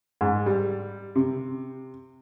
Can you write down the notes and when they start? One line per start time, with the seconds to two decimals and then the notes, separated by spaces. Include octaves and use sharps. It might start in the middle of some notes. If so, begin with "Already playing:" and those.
0.21 G#2
0.46 G3
1.16 C3